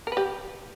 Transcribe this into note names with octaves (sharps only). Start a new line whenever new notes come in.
G4 A#4 B4